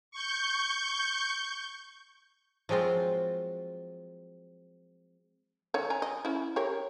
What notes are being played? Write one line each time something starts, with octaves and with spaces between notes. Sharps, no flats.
C#6 G6
F3 F#3 G#3 C4 F4
D#3 C#5
G#5 A#5
D#5
C#4 E4
G4 A#4 C#5